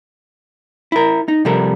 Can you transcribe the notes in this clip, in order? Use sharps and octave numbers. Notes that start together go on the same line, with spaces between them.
E4 A#4
D#4
C3 F3 G3 A4 A#4